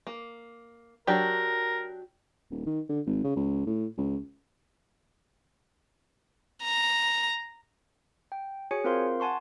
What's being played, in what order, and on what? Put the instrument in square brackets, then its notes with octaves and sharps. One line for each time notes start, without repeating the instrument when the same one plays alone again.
[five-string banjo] A#3
[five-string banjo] F#3 D4 G4 [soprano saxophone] A#4
[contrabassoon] D#1
D#3
D3
G#1
C#3
C#2
A2
C#2
[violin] A#5
[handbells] G5
F#4 G#4 C#5 G#5 C#7
C4 F4 A#4 C5 F5 C6
F#5 G#5 A5 C6 C#6